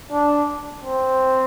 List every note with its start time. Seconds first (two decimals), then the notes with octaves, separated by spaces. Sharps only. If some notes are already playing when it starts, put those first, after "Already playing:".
0.11 D4
0.84 C4